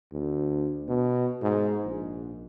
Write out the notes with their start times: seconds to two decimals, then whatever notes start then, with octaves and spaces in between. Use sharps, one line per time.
0.12 D2
0.88 B2
1.42 G#2
1.85 A#1